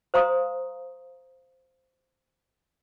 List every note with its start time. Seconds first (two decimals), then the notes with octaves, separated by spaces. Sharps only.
0.14 C5 F5 A#5 C6 D#6